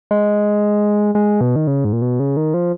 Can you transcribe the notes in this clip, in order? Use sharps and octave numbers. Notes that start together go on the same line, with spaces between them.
G#3
G#3
B2
D#3
C#3
G#2
A#2
B2
C#3
D#3
F3